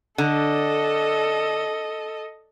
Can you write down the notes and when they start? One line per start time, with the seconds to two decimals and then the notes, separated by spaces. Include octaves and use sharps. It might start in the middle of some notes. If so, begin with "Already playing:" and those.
0.18 D3 A4 D#5